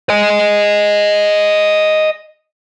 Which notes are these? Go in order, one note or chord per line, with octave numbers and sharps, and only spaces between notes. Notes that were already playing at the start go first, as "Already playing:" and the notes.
D#5 G#5